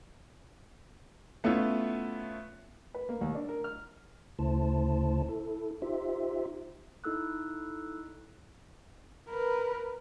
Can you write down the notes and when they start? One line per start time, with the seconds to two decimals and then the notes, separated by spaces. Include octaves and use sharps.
1.44 A3 B3 C#4 E4 F4
2.94 B4
3.09 A#3
3.21 D#2
3.35 D4
3.49 A#4
3.64 F6
4.39 D2 C#3 A3 E4 C5 A5
5.29 E4 A4
5.82 D#4 F4 G4 C5 E5
7.04 D#4 E4 A4 E6 F#6
9.29 A#4 B4